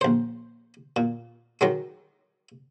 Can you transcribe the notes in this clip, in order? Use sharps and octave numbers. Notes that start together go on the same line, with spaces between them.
A#1 C5
A#2
D#3 F#3 G#3